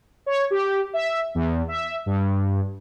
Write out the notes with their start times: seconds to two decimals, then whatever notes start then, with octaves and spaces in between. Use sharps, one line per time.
0.26 C#5
0.51 G4
0.93 E5
1.35 E2
1.68 E5
2.06 G2